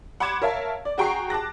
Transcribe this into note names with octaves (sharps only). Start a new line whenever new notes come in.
F#5 B5 C6 D6 G#6 E7
A#4 C#5 E5 F5 A5
D5
F#4 G#4 G5 A#5 C#6 C7
A5 D6 F#6 A#6